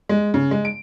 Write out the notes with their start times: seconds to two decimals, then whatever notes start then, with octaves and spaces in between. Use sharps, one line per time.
0.09 G#3
0.34 C#3
0.51 G#3
0.65 D7